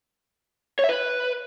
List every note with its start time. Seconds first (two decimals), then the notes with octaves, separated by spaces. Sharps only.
0.79 C#5
0.84 E5
0.89 B4